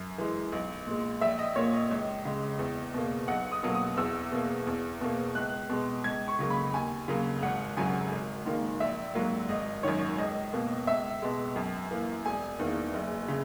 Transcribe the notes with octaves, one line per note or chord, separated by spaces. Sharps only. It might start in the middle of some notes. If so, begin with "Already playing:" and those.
Already playing: F#2
E3 G#3
B1
A#2 G#3
A#1 E5
D#5
A#2 A#3 C#5
D#5
C#2
C#3 G#3
E2
B2 A#3
B1 F#5
D#6
B2 F#3 A#3
D#6
E2 E6
B2 A#3
E2
B2 A#3
C#2 F#6
B2 G#3
C#2 G#6
C#6
C#3 F#3 A#3
B5
D#2 G#5
C#3 F#3 A#3
G#1 F#5
F#2 C#3 F#3 G#5
G#1
G#2 D#3 A#3
A#1 E5
G#2 F#3 A#3
G#1 D#5
F#2 D#3 C#5
C#2 D#5
B2 A#3
C#2 E5
B2 G#3
F#2
E3 A#3
E1 G#5
E2 D#3 A#3
F#1
C#3